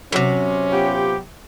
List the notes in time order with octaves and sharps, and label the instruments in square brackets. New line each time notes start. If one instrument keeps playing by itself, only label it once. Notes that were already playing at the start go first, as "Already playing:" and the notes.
[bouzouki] A2 C3 [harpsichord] F#3 [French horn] C#4
[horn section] B3 F4 G4